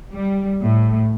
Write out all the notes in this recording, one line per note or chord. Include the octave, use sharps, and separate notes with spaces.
G3
A2